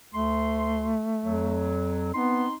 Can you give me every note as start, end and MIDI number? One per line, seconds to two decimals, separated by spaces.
0.14 0.94 38
0.14 1.79 57
0.14 0.94 84
1.25 2.14 41
1.25 2.14 54
2.15 2.46 59
2.15 2.55 60
2.15 2.55 63
2.15 2.55 84